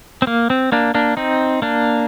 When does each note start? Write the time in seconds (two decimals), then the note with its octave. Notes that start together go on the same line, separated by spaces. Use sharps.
0.22 C4
0.27 A#3
0.50 C4
0.72 A#3 D4
0.95 A#3 D4
1.17 C4 D#4
1.62 A#3 D4